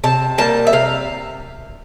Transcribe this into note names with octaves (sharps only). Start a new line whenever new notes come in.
C3 A5
G3 A#3 A5
E5
C3 F5